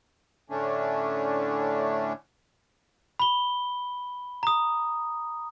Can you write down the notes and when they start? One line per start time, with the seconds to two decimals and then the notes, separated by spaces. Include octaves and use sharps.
0.50 A2 D3 A3 C#4 D4
3.20 B5 G7
4.43 A#5 D#6